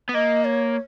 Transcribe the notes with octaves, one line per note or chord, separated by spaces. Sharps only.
B3
A#3 D#5
C#5